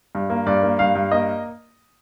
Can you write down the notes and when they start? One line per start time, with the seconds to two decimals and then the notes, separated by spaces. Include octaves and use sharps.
0.15 G2
0.30 A#3
0.46 G2 D5
0.63 A#3
0.79 G2 F5
0.95 G2
1.12 A#3 D#5